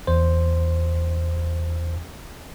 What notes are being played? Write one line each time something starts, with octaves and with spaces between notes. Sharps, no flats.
E2 C5